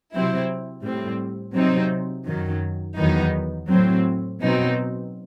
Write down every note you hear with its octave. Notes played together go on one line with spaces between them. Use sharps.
C3 F#3 C4 E4
A2 G3 C4
C3 F#3 C4 D#4
F#2 D#3 F#3
E2 D#3 F#3 B3 D#4
A2 F#3 C4
B2 F#3 C4 D#4